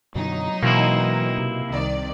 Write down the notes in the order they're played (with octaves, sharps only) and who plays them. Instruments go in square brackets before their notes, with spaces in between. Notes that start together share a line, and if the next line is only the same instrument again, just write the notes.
[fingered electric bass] F#2 B2 D3 [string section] F#3 D#4
[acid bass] B2 [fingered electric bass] E3 [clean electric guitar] A#3 C4 E4
[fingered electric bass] C3
[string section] C2 D#3 D5